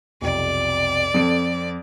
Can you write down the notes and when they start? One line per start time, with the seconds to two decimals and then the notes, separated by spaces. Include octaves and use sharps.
0.22 B1 F2 C3 D5
1.14 F2 C4 A4 D7